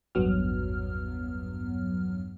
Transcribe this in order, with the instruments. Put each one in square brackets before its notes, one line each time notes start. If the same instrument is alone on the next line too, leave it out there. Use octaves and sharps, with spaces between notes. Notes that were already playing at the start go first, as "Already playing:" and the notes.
[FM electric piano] A1 E2 G2 F#3 B3 F6